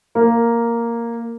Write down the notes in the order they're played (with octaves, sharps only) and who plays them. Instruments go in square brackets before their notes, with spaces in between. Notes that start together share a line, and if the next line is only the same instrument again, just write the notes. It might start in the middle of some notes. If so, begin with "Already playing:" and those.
[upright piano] A#3